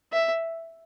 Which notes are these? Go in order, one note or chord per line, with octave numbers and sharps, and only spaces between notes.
E5